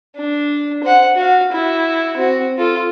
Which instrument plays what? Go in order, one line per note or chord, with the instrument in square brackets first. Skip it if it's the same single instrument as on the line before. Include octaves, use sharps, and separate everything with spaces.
[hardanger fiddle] D4
C5 F#5
F#4 F5
E4 F#4
C4 F#4
F4 A4